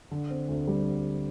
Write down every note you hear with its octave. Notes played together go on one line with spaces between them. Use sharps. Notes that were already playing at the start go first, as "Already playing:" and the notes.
D3
C4
D2
G3